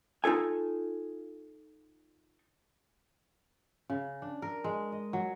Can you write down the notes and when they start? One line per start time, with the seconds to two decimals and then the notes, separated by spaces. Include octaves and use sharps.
0.24 D#4 F4 A4 G#5
3.90 C#3
4.22 D4
4.42 A#4
4.64 G#3
4.92 D#5
5.13 F#3